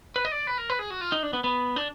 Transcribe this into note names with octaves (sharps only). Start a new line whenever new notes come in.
B4
D#5
D5
B4
A#4
B4
G#4
F#4
F4
D#4
D4
B3
B3
D4